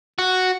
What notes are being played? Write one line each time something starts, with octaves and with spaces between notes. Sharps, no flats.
F#4